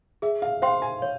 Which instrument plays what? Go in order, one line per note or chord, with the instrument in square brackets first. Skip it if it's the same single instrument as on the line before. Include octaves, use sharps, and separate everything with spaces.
[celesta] G#4 [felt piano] E5
[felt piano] F5
[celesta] C5 G5 C6 [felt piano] F5
[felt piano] G#5
[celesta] C#5